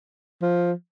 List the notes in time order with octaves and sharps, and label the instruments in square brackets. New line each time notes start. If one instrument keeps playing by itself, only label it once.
[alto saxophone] F3